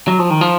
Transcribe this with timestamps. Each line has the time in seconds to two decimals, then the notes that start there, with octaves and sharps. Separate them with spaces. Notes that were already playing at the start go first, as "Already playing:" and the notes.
0.08 F#3
0.19 F3
0.30 D#3
0.41 F3